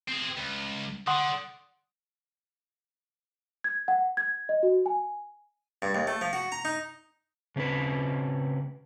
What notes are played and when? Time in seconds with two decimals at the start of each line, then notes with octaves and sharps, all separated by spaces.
0.08 C4 G#4
0.37 C#2
1.07 D3 F#5 C6 D#6
3.64 G#6
3.88 F#5
4.17 G#6
4.49 D#5
4.63 F#4
4.86 G#5
5.82 G2
5.95 D#2
6.07 A3
6.21 F3
6.33 F#4
6.52 A#5
6.65 D#4
7.56 C#3 C4 C#4 B4